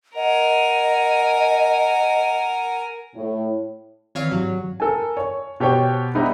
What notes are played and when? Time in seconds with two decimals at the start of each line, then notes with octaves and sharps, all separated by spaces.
0.16 A#4 D#5 F#5 G#5
3.16 A2
4.15 D#3 E3 C4 C#5 F5
4.31 G#2 F#3
4.80 A4 A#4 G#5
5.17 C#5
5.60 B2 G4 C5 C#5 G5
6.14 G3 B3 D#4 E4 G4 B4